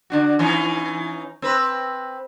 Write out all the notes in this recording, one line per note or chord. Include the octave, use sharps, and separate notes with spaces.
D3 D4 F#4
E3 C#4 D#4
C4 B4